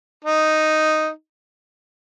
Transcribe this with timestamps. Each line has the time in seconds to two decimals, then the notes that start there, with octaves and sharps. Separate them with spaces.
0.24 D#4